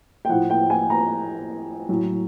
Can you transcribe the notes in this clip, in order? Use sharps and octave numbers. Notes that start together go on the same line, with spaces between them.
G5
A2 F3 F#5
G5
G#5
A#5
A2 F#3